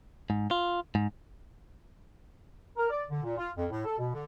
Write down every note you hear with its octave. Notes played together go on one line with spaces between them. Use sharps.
G#2
F4
G#2
A#4
D5
D3
A#2
F4
F2
A2
A4
B2
D3